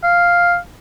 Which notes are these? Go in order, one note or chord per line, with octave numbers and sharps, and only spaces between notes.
F5